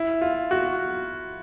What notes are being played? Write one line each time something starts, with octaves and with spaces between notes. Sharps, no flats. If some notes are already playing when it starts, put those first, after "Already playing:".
Already playing: E4
F4
F#4